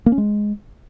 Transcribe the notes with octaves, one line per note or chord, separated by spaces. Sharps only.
A#3
C#4
G#3